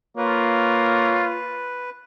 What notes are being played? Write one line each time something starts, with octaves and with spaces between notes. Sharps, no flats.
A#3 F4 B4 C#5